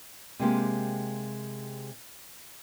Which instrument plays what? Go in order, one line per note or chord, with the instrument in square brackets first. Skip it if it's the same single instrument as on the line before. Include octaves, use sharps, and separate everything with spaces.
[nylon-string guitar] C3 G#3 A#3 G4